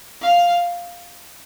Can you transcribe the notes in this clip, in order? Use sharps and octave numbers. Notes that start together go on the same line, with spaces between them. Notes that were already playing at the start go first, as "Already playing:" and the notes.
F5